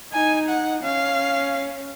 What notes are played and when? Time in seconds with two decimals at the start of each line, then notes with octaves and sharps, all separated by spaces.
0.12 D#4 G#5
0.48 F#5
0.83 C#4 F5